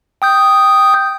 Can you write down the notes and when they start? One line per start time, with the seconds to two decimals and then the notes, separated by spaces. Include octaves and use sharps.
0.22 G5 D#6 G6